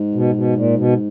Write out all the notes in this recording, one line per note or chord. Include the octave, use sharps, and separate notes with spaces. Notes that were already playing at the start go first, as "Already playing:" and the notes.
Already playing: G#2
B2
B2
A#2
B2